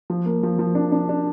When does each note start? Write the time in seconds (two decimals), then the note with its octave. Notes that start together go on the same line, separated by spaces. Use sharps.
0.10 F3
0.26 A#3
0.43 F3
0.59 F3
0.75 D4
0.92 D4
1.09 D4